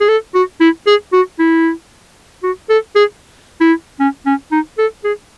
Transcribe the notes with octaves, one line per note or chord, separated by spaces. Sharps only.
G#4
A4
F#4
E4
G#4
F#4
E4
F#4
A4
G#4
E4
C#4
C#4
D#4
A4
G#4